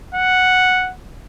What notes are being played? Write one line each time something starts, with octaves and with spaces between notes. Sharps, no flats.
F#5